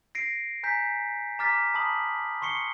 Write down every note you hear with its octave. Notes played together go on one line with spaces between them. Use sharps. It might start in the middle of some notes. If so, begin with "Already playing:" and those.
A#6 C7 D7
G#5 A#5 G6 B6
A#5 D6 F6 A6 B6
A5 B5 D#6 F#7
C6 C#6 C7 C#7 G7